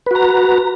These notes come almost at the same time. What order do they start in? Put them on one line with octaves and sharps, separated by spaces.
B4 F#4 A#5